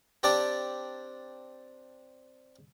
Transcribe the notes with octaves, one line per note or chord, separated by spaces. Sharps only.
C4 D4 G4 D5 A5 A#5